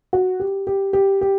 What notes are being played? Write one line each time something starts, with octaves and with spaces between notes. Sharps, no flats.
F#4
G4
G4
G4
G4